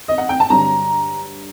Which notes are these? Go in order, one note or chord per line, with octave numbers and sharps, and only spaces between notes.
D#5
F#5
G5
A5
G2 D3 F#3 A#5